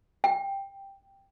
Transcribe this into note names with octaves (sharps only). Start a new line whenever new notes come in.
G5